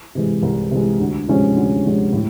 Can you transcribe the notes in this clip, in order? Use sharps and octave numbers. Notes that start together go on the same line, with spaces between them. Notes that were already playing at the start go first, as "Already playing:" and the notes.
C3 E3 G#3
C2
C3 E3 G#3
D2
C3 F3 G#3 C#4
D2
C3 F3 G#3 C#4
A2